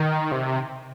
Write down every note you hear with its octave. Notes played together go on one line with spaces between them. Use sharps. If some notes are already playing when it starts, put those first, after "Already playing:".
Already playing: D#3
C3